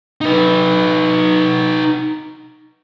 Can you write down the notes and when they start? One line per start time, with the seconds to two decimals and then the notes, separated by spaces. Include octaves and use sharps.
0.21 D#4 B4